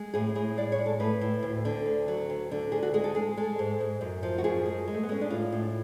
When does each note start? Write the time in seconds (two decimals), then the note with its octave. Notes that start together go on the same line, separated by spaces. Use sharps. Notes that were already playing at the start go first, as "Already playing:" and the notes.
Already playing: G#3
0.14 A2 G#4
0.35 A2 G#4
0.57 G#3 D5
0.72 C#5
0.79 G#3
0.86 A4
1.00 A2 B4
1.21 A2
1.43 D2
1.65 D3
1.86 D2
2.08 F#3
2.30 D2
2.51 D3
2.72 D2 G#4
2.83 F#4
2.94 G#3 G#4
3.04 A4
3.15 G#3 G#4
3.37 G#3 A4
3.59 G#2
3.81 G#2
4.01 F#2
4.23 F3
4.38 F#4
4.44 F#2 G#4
4.65 G#3
4.88 G#3
4.94 A3
5.03 B3
5.09 G#3 C#4
5.21 D4
5.30 A2 F4
5.52 A2